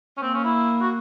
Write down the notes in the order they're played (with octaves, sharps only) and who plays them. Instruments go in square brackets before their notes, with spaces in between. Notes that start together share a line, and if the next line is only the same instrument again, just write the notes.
[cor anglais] C#4
[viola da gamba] A#3 [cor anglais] C4
[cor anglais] C#4
E4
F#4